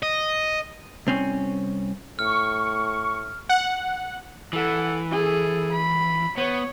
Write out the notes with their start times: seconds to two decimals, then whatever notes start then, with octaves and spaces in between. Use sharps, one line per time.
0.03 D#5
1.07 C2 C4 C#4
2.19 A2 C#6 F6
3.49 F#5
4.53 E3 A4 F#5
5.11 G#4 A4
5.72 B5
6.38 B3 C#5